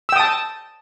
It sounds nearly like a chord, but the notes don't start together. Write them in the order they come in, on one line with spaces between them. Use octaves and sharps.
E6 G5 D#6 A5